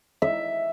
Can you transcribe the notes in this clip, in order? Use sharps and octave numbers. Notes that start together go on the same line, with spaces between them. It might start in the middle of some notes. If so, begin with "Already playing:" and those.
E5